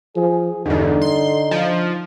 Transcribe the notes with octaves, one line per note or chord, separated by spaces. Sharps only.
F3 G#4
E2 G2 D3 D#4
C6
F3